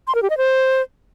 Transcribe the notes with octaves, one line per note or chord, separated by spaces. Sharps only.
C6
A#4
G4
D#5
C5